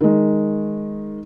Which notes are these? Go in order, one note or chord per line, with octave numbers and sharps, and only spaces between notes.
D#3 G#3